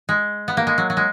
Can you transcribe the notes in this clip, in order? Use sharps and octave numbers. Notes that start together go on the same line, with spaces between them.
G#3
B3
A#3
G#3
F#3
F#3
G#3